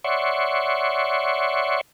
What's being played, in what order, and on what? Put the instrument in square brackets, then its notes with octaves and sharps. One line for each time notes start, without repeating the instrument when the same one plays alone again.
[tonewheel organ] C#5 D5 E5 F#5 C6 C#6